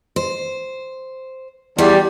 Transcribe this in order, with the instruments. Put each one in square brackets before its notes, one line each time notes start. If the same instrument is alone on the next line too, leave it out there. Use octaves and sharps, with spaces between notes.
[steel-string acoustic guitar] C5
[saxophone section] E2 [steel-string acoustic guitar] G3 [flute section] G4 D5